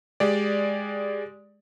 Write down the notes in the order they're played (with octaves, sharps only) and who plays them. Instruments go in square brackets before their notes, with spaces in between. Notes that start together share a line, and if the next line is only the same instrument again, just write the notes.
[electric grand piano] G#3 G4 D5